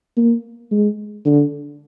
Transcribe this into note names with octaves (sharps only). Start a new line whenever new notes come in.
A#3
G#3
D3